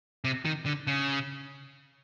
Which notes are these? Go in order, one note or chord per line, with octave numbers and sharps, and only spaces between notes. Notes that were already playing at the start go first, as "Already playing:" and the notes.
C3
D#3
D3
C#3